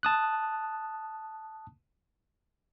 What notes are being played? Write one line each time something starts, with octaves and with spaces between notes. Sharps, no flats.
A5 D#6 F#6